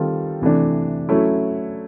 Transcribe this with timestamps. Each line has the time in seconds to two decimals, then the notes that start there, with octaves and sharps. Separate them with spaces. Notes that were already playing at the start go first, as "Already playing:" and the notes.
Already playing: D#3 G3 C4 F4 A4
0.42 C3 E3 A3 D4
1.09 F#3 A3 C#4 E4